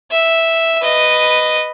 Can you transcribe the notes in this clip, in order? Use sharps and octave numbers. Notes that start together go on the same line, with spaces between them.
E5
B4 D#5